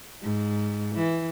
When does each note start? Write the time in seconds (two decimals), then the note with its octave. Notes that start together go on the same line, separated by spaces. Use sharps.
0.23 G#2
0.96 E3